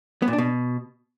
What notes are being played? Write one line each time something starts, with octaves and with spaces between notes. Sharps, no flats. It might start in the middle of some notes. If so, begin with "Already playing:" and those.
B3
A#2
D4
B2